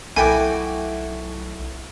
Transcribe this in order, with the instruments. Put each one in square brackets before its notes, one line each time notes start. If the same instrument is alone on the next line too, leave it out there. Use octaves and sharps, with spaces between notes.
[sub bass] B1 [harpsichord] A3 F#4 [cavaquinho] E4 G5 D6 [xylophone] G#5